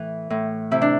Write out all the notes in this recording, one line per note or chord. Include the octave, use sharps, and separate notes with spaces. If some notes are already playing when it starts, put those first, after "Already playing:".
Already playing: A2 E3
A2
C3 E4
D4